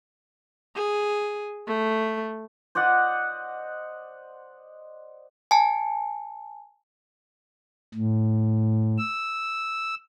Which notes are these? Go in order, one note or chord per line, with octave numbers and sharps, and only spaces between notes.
G#4
A3
C5 D5 D#5 F#5
G#5 A5
A2
E6